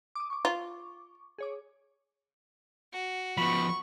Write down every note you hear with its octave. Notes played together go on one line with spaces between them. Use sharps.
D6 D#6
C#6 D6
F4
G#4 C#5 D6
F#4
F3 B3 B5 C#6